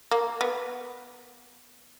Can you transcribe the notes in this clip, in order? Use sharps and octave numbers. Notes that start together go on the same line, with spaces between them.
A#3
B3